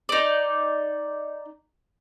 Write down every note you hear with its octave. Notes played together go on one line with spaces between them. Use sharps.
D#4 D5